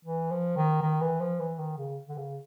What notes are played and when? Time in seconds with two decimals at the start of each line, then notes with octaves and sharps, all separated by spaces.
0.05 E3
0.31 F3
0.57 D#3
0.82 D#3
1.01 E3
1.21 F3
1.40 E3
1.58 D#3
1.78 C#3
2.09 D3
2.17 C#3